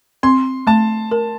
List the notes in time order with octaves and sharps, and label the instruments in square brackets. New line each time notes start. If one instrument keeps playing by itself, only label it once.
[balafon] C4 [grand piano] C6
[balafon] A3 [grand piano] A5
[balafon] A#4